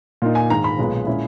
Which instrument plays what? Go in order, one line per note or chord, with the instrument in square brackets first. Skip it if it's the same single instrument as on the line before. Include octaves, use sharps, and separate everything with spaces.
[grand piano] A#2 A#3 D#4
G#5
G#2 D#3 G#3 A#5
B5
B1 A#2 G#3 B3
A#2 G#3 C#4 E4